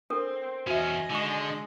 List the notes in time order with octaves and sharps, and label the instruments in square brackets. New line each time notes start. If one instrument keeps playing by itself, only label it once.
[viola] C4 [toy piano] D4 A4 A#4
[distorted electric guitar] E2 C#4 [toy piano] F#4 E5 [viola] D#5 G#5
[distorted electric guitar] D3 [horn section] G#3 [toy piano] D#4 C#6